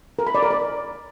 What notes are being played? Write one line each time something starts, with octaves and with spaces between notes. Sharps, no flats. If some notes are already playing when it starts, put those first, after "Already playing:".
A#4
B5
D5
A#4
D5